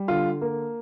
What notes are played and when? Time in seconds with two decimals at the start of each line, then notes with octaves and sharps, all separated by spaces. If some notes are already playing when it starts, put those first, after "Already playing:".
Already playing: G3
0.08 D3 F4
0.41 A#3